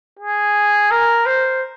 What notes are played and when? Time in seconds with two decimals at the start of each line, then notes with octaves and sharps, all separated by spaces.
0.19 G#4
0.91 A#4
1.26 C5